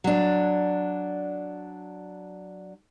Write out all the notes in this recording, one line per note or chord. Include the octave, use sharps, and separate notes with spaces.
F#3 D4